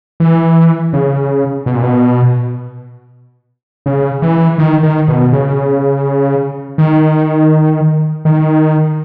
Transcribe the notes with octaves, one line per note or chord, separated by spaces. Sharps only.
E3
C#3
B2
A#2
B2
C#3
E3
D#3
D#3
B2
C#3
D#3
D#3